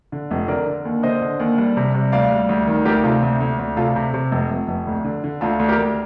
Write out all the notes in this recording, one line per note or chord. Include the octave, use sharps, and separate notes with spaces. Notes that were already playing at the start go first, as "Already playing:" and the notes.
D3
F1
D3 A#4 D5
D3
D#2
D3 C5 D#5
D3
D#2
G3
C3
G3
D2 D5 F5
G3
D2
D#3
D2 G4 A#4
C3 F4 A4
D2
D2
D2
C3 F4 A4
C3
C3
F1
F1
F1
D2
D3
D3
D2 F4 A4
D2
G4 A#4
D2